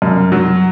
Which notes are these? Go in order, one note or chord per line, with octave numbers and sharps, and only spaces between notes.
F#2
F#3